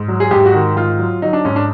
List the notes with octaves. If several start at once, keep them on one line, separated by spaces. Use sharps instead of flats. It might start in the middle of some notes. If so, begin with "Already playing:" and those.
Already playing: G#2
F#3
G#4
G#2 G4
F#4
D#3
G#2 F4
F#3
F#3 D#4
D4
G#2 C#4
D4